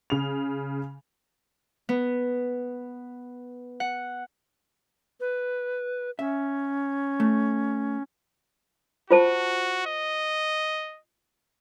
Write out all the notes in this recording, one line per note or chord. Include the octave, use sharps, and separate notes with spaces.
C#3 F7
B3
F#5
B4
C#4 E5
A3
F4 F#4 C5 A5
D#5